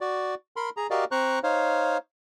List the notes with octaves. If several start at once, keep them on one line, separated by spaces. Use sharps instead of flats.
F#4 D5
A#4 B5 C6
G#4 A#5
F#4 G4 A#4 D5 D#5 F5
C4 C5 A#5 C#6 F#6
D#4 C5 C#5 F5